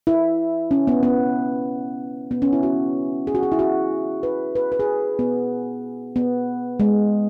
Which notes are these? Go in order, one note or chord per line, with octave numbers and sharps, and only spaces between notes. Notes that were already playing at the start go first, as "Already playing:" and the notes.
E4
C#4
B3
B3
B3
C#4
E4
F#4
G#4
F#4
G#4
E4
F#4
B4
B4
B4
G#4
B3
B3
G#3